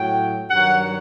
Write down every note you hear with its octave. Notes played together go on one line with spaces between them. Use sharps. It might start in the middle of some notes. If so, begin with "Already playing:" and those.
Already playing: A2 F#3 G5
G2 D#3 F#3 F#5